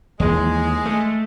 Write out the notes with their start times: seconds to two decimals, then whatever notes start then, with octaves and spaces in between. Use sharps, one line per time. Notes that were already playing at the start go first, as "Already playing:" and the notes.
0.20 D#2 E3 F3 G#3
0.86 A3